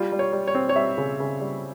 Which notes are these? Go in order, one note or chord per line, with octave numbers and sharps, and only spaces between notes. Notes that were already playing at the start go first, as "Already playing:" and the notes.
Already playing: G3 F4
G3
C#5
G3
C#5
C4
C#5
G3 E5
C#3
C#3
G3